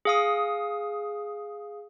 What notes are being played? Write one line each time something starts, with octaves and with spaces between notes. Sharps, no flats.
G#4 F5 D#6